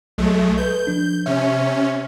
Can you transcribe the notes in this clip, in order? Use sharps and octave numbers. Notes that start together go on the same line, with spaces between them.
B1 F#3 G#3 A3
A4 B4 G6
F3 D4
C3 C#4 E5